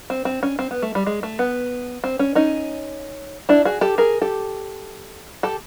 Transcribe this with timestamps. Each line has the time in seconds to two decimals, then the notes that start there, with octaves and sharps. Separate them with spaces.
0.10 C4
0.25 C4
0.43 C#4
0.59 C4
0.71 B3
0.82 A3
0.95 G3
1.06 G#3
1.23 A3
1.39 B3
2.04 C4
2.19 C#4
2.35 C#4 D#4
3.49 D4 E4
3.65 F#4 G#4
3.81 G4 A4
3.98 G#4 A#4
4.21 G4 A4
5.43 G4 A4